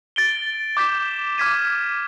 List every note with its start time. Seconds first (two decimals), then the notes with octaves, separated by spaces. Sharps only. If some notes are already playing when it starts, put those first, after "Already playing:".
0.16 A6 D7 G7
0.77 D6 G6 B6 E7
1.38 D6 F6 G#6 B6 D#7